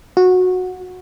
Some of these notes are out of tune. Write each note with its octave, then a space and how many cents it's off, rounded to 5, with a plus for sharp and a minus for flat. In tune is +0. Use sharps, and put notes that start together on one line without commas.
F#4 -15